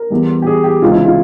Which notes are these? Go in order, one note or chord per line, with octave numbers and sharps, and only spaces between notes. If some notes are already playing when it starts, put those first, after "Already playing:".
Already playing: A#4
E2 E3 G3
G4
G#4
G4
C#2 C3 E3 G#3 F4
E4
F4